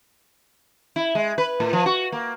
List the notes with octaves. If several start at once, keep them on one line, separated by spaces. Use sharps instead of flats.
E4
G#3
B4
A2
F3
F#4
A#3